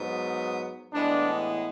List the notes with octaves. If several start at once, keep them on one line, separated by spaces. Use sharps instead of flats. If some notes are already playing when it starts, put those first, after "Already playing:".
Already playing: G#2 F#3 B3
A2 E3 G#3 B3 D4